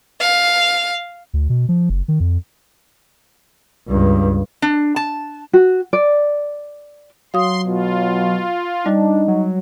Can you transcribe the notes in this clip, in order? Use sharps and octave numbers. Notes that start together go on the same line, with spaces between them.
F5
D2
B2
F3
F#1
D#3
F2
C#2 G2
D4
A5
F#4
D5
F#3 F5 C6 D#6
B2 F4
G3 D4 D#4
F#3